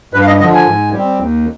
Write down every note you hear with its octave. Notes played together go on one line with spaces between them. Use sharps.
G2 B4
F5
D#5
D3 F3 D#5
G#5
G#2
G3 C4
D#2